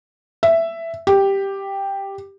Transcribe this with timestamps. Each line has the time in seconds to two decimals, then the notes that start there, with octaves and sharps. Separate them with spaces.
0.43 E5
1.07 G4